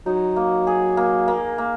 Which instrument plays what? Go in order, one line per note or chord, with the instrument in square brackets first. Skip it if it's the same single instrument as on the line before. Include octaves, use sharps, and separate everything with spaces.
[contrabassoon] F#3 [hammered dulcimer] D#4
[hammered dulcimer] A#3
G#4
A#3
A#3
A#3